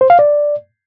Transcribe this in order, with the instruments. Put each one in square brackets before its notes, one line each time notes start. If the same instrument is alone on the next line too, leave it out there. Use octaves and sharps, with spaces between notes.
[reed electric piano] C5
F5
D5